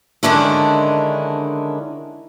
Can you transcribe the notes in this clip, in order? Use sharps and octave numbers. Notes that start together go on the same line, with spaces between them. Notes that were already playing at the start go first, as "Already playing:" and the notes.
D3 D#3 G#3 C#4 D4 E4